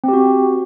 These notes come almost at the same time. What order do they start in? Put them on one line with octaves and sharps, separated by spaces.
C4 G4 F#4